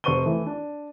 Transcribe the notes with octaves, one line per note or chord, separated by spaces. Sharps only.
F1 C5 C#6 D#7 G7
E3 A3
D4